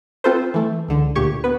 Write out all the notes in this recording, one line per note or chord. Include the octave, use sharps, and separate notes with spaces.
C4 F4 A4 B4 C5
E3 A3
C#2 D3
D2 A#2 G4 C#6 G#6
B3 B4